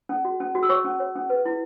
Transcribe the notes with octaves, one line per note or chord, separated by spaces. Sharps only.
C#4
F#4
C#4
F#4
E6
C#5 C#6
C#4
C#5
C#4
B4
E4